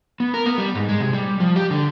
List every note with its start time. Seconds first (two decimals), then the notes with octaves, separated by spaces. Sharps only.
0.20 B3
0.34 A#4
0.46 B3
0.58 G3
0.75 G#2
0.89 G#3
1.01 C3
1.13 G3
1.40 F3
1.56 G4
1.71 D3